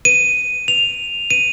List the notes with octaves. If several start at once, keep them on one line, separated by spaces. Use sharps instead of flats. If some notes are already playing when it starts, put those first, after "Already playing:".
D#7
F7
D#7